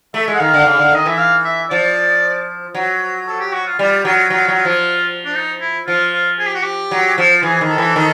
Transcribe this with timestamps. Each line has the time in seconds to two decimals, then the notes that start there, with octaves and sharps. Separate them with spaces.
0.14 A3 E5
0.28 G#3
0.34 F#5
0.40 D#3 F5
0.54 D3
0.66 C#3
0.79 D3
0.92 D#3 D#5
1.05 E3 E5
1.18 F5
1.44 E5
1.70 F3 D5
2.75 F#3
3.27 A4
3.40 G4
3.52 F#4
3.66 F4
3.79 G3 F4
4.05 F#3 F4
4.30 F#3 F4
4.48 F#3
4.57 F4
4.65 F3
5.25 D4
5.35 D#4
5.61 E4
5.87 F3 F4
6.13 F4
6.39 G#4
6.47 G4
6.55 F#4
6.63 G4
6.91 F#3
7.18 F3
7.43 E3 G#4
7.61 D#3
7.69 A4
7.78 E3
7.96 D#3